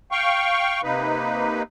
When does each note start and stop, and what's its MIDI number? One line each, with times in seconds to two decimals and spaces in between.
0.12 0.81 77
0.12 0.81 79
0.12 0.81 85
0.83 1.62 48
0.83 1.62 58
0.83 1.62 63
0.83 1.62 71